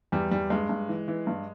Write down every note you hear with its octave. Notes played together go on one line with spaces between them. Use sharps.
E2 G3
E2 G3
G2 G#3
G2
E3
E3
G2